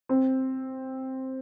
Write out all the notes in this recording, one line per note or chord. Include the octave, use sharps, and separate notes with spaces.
C4